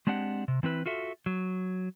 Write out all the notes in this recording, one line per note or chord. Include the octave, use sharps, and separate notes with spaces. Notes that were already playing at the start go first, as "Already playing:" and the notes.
G#3 C4 D4 G4 F#5
C3
E3 C4 E4 B4
F4 F#4 A4 E5
F#3